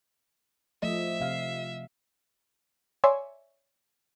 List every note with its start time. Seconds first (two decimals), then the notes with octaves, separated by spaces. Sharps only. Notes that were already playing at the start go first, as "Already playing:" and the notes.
0.82 F3 A3 D#5 E5
1.20 C3 F5
3.04 C#5 D5 E5 G#5 C6 C#6